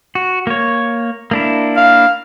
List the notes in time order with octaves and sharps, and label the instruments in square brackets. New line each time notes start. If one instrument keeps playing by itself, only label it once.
[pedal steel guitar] F#4
A#3 C#5
A#3 D4 E4
[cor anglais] F5